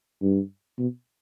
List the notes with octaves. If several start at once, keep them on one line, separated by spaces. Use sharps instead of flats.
G2
B2